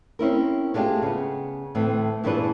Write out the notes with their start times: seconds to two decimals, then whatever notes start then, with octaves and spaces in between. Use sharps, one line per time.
0.19 C4 C#4 E4 A#4
0.74 G#3 A3 D4 F4 G4
1.02 C#3 B3
1.75 D2 A2 E3 A3 C4
2.24 G2 A#2 E3 G#3 D4 B4